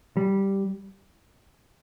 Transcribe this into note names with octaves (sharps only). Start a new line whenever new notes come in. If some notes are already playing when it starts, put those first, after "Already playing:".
G3